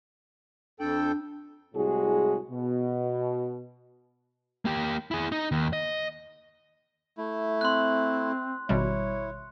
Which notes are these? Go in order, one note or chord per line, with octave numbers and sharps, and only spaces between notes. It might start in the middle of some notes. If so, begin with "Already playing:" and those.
F2 D4 A4 G5
C2 A2 G#3 F#4 G#4
B2
A#3 G4
E4 G#4
D#4
D#2
D#5
A3 E4
C4 C6 F#6
G#1 B2 G3 E4 C#5